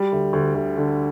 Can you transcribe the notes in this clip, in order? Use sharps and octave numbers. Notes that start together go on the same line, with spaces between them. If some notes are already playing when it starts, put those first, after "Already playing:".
Already playing: G3
D2
D2
D2
D3